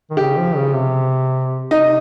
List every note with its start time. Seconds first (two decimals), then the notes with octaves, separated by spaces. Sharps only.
0.10 D#3
0.17 C#3 G4
0.37 F3
0.56 C#3
0.75 C3
1.71 C3 D#4